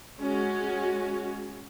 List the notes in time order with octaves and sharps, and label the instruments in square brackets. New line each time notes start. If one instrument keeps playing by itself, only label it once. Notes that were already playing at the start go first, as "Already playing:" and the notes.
[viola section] G#3 C#4 F#4